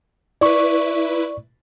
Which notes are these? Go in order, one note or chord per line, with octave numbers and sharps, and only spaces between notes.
E4 B4 D5 C#6